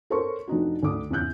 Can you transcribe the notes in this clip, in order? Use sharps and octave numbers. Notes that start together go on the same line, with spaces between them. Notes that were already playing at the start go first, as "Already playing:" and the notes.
A4 A#4 C5 C#5 C6 C#6
F1 D4 D#4 F#4
D2 D6 D#6
E2 C#3 E3 F#6 G6